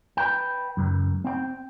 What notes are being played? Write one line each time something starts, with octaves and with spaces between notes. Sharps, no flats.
B4 G5
C#2 F#2
C4 G5